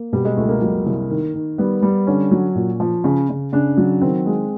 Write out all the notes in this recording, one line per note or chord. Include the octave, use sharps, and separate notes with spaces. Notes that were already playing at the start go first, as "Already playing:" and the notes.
Already playing: A#3
B2 G3
G#3
C#2 A3
A#3
F#3
C2
D#3
D#3
G3 B3
G3
D3 C#4
F#3
A#2
F3
C#3
C#3
C#3 D4
F#3
D#3 C4
G#3